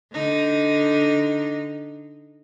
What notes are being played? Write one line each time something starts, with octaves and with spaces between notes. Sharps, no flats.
D3 D#4